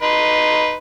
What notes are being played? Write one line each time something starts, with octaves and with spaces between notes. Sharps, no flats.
D#4 B4 C6